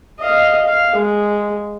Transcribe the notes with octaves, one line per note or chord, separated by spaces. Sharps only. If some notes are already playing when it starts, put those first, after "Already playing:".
D#5 F5
F5
G#3